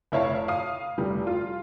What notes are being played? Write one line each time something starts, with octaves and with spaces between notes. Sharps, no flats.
F1 E4 C#5 F5 A5
F5 D#6
F1 G3
F4